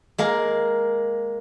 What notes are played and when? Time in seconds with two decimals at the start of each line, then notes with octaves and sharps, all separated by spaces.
0.18 G#3 A#3 A#4